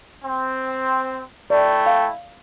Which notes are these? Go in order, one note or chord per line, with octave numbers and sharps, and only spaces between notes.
C4
A3 E4 D5 G5
F5